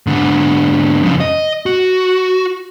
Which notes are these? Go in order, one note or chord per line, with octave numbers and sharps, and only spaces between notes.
G#2 D3
F2 C#3
D#5
F#4